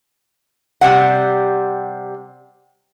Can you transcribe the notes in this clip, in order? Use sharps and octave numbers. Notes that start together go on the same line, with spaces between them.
C3 G3 F#5